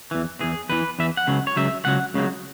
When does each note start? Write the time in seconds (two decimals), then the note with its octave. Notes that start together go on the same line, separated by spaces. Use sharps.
0.11 E2 E3
0.40 E2 E3 G#4
0.69 E2 E3 B4
0.99 E2 E3 E5
1.17 F#5
1.27 C#2 C#3 F#3
1.47 C#5
1.56 C#2 C#3 F#3 E5
1.85 C#2 C#3 F#3 F#5
2.14 C#2 C#3 F#3